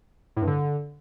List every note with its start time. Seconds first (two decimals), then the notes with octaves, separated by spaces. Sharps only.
0.37 A2
0.42 G2
0.47 D3